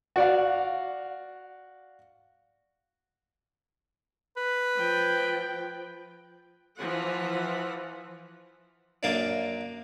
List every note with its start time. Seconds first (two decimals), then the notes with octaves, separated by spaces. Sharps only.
0.16 F#4 D5 F5
4.37 B4
4.77 F3 G5
6.79 E3 F3 F#5
9.03 F#2 A#3 D4